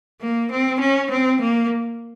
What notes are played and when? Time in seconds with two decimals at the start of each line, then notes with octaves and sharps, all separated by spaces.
0.21 A#3
0.50 C4
0.79 C#4
1.10 C4
1.40 A#3